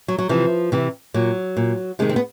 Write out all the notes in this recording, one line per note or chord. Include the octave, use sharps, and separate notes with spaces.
F#3
F#3
C3 E3 F3
C3 E3
A#2 F#3
A#2
C3 D#3 G#3
C4
B3